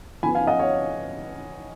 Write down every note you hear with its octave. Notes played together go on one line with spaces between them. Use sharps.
F3 B3 G#5 B5
F5 G#5
D#5 F#5
C#5 F5